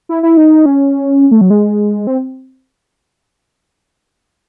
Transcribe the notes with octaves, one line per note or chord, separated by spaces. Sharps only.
E4
E4
D#4
C#4
A3
F#3
G#3
C4